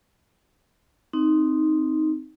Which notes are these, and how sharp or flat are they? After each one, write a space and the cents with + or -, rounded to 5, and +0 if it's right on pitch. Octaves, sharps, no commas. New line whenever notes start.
C4 +0 D#4 +0